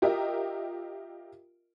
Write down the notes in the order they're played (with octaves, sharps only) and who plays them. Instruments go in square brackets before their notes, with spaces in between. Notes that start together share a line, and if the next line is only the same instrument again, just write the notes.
[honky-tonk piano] F4 G4 A#4 D#5 E5